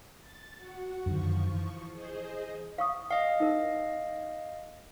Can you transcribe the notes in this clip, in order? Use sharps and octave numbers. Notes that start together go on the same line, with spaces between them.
A6
F#4 F#5
F#2 D3 D#3 F3 C#6
E3
G#4 C5 D#5
F5 C#6 D#6
D#5 F5 G5
D#4 A#4